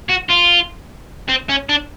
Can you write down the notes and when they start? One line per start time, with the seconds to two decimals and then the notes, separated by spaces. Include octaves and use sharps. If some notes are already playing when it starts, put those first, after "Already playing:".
0.09 F#4
0.29 F4
1.29 C4
1.49 C#4
1.69 D4